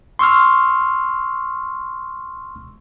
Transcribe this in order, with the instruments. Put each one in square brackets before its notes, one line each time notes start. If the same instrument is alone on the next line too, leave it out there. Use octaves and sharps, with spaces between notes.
[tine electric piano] C6 C#6 E6 F6